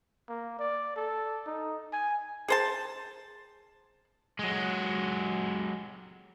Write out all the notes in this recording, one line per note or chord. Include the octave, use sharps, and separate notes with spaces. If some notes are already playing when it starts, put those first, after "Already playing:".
A#3
D5
A4
D#4
G#5
G#4 C5 A5
F#3 G#3